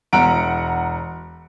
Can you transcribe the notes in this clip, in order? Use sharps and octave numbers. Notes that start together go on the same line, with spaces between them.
E1 F#5 A#5 D7